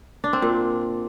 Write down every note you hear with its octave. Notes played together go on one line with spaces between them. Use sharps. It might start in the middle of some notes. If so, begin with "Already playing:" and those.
D4
C4
A#2